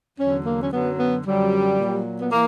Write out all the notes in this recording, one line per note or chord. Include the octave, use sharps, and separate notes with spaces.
E2 D3 F#3 C#4
A#3
C#4
F#2 D3 F#3 B3
B3
F#2 D3 F#3 G3
A#2 F#3
B3
E3 A#3